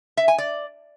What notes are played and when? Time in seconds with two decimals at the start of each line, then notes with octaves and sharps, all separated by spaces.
0.17 E5
0.28 G#5
0.38 D5